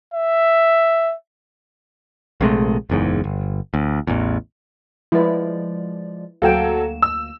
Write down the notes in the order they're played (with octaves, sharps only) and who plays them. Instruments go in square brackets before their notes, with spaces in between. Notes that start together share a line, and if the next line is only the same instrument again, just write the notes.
[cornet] E5
[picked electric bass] A#1 C3 G#3 A3
F#1 E2 G#2
G1
D2
A1 E2
[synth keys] F3 G#3 D5 [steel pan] E4 B4
[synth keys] D2 A#3 E7 [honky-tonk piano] F#3 A4 [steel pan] F5 G5
[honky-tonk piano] E6